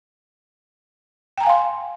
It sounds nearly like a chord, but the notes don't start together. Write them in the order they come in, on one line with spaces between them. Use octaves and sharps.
G5 A#5 G#5 F5 C6